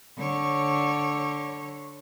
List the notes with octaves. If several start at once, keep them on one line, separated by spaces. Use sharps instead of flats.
D3 C#5